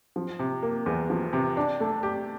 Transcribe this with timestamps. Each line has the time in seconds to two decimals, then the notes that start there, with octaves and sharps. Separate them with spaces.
0.16 F3
0.39 C3
0.63 A#3
0.86 E2
1.10 F3
1.33 C3
1.57 D4
1.80 A3
2.03 G4